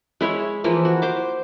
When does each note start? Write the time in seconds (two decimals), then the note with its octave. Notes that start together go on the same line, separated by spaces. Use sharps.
0.21 G#3 E4 C#5
0.64 E3 F3 A#3
0.85 F#4
1.02 C5 D6